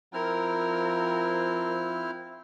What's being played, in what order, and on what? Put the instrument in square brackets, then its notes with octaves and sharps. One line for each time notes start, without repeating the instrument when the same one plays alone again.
[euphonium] F3 [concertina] C4 E4 F6 [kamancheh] A#4